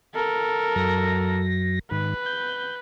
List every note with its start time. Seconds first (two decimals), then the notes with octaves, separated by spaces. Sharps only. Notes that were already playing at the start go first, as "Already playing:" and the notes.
0.15 A4 A#4
0.76 F#2 F#3 A#6
1.91 G#2 D#3 B4
2.26 G6